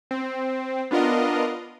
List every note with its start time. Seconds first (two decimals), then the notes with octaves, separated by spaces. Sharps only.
0.11 C4
0.91 B3 D4 F4 A#4 D#5